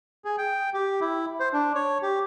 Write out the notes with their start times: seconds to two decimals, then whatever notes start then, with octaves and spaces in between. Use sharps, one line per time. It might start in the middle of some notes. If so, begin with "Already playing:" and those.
0.25 G#4
0.38 G5
0.74 G4
1.01 E4
1.40 C5
1.53 D4
1.75 C#5
2.02 G4